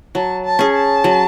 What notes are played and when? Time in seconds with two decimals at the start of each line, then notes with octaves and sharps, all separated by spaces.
0.15 F#3 A5
0.45 A5
0.59 C#4 G#4
0.74 A5
1.04 F#3